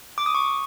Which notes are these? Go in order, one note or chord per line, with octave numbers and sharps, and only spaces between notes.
D6
D#6
C#6